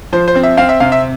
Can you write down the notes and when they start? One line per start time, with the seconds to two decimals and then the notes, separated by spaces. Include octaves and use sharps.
0.13 F3 C5
0.28 C5
0.35 C4
0.43 E5
0.57 C4 F5
0.69 E5
0.80 C3 F5
0.92 E5